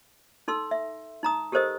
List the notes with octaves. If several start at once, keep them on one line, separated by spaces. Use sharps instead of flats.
D#4 A4 C6 E6
E5
D#4 A#5 D#6
G4 A4 A#4 C5 D#5 D#6